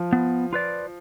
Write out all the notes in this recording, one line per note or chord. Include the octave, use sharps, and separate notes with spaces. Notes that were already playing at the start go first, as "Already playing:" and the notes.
Already playing: F3
B3
F4 B4 D5